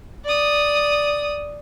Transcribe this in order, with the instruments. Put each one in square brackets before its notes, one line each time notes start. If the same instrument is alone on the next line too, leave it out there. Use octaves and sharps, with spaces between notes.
[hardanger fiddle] D5 D#6